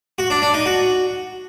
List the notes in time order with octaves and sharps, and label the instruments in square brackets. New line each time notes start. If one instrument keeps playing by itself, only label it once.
[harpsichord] F#4
D4
D4
D#4
F#4